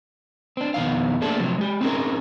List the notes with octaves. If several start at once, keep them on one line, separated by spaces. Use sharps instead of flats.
C4 D4
F2 B2 D#3 D#4 F5
A3 A#3 D4 G#4 A4
C3 F3 F#3 C4
G#3 G4
C4 C#4 D#4 G#4 A#4